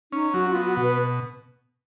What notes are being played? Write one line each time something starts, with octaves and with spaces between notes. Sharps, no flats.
C#4 D#4
F#3 F#4
B3 F4
F#4
B2
B4